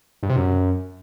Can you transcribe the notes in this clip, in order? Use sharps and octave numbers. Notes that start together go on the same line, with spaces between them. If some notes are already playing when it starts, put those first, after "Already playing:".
G2
C3
F#2